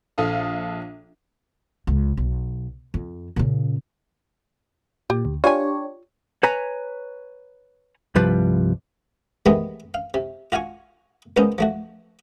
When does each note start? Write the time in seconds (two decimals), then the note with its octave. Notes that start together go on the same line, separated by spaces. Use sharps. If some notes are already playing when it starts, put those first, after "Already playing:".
0.18 A#1 A4 F5 D#6
1.87 C#2
2.17 B1
2.94 F2
3.36 A#2 C#3
5.10 A#2 G4
5.25 D2
5.44 D4 F4 G4 C#5 G#5
6.43 B4 C#5 G#5 A#5
8.15 C2 G2 F3 G3 B4
9.46 C3 D#3 E3 G#3 A3 B3
9.94 F5
10.14 C3
10.52 F4 F#4 F5 G#5 C#6
11.37 C#2 A#2 B3 C#4 D#4 C5
11.58 F3 A3 F#4